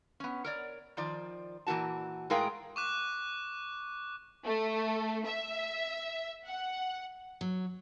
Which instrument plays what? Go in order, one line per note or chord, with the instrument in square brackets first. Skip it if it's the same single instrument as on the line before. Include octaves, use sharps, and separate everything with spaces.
[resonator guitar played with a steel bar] B3 C#4
A#4 C#5 D5
D#3 F3 D5
A#2 E3 A#3 F#4 A5
A2 G#3 G#4 A#4 F5 G5
[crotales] C#6 D6 F#6
[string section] A3
E5
F#5
[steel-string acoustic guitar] F#3